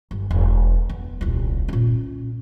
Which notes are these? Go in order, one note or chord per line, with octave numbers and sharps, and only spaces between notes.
G1
E1
B3
D#1 C2
A#2 C#4